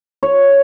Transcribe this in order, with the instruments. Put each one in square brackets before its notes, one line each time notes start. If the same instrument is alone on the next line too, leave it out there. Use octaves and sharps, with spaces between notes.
[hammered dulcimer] C#5